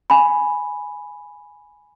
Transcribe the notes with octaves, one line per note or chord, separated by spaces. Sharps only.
G#5 B5